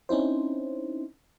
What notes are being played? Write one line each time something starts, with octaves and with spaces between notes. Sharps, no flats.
C4 C#4 D#4 E4 C5